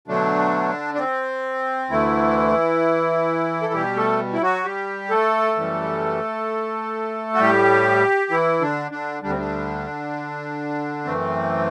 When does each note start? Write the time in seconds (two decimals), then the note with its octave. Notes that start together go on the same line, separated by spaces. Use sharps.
0.08 B2 D3 F#3 A3 D4
0.95 D4
0.99 C4
1.90 D2 D3 E3 A3 E4
3.62 A4
3.73 B2 G3 G4
3.96 A3 A4
4.33 E4
4.41 F#3 F#4
4.64 G3 G4
5.10 A3 A4
5.56 F#2 E3 G3
7.34 F#4
7.39 A2 G3 G4
8.30 E3 E4
8.61 D3 D4
8.91 D3 D4
9.22 D2 D3 G3 D4
9.30 C4
9.38 D3 D4
11.05 F#2 E3 A3 C4